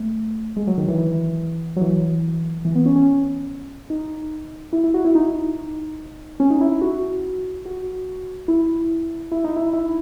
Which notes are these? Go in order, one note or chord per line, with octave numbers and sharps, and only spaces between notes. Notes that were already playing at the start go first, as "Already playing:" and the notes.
Already playing: A3
G#3
F#3
D#3
E3
E3
F#3
E3
E3
B3
C#4
C#4
D#4
E4
E4
F#4
E4
D#4
C#4
D#4
E4
E4
F#4
F#4
E4
E4
D#4
E4
E4